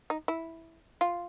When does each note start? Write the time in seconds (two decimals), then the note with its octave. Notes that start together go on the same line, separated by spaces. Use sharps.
0.10 D#4
0.28 E4
1.01 F4